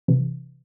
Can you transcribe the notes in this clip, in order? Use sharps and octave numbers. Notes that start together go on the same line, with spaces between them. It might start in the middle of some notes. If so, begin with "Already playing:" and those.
C3 E3